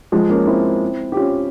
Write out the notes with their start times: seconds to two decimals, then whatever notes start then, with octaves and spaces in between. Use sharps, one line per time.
0.12 F3 G#3
0.29 A#3 C#4
0.47 C4 E4
1.12 G4
1.16 C#4 F4